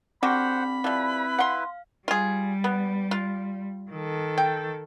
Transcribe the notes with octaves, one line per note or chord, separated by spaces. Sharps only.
D3 C4 F#4 G4 C5 F#5 B5
F3 G3 E4 B4
F5 F#5 C6
G3 F4 G#4
B3
F4
D#3 A4
G5